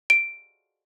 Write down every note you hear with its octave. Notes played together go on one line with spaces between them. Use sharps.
D7